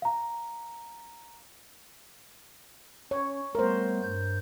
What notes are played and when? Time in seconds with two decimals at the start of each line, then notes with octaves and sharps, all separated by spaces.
0.02 F5 A#5
3.11 C#4 C#5
3.55 G3 A3 B3 A#4 C5
4.03 G2 G6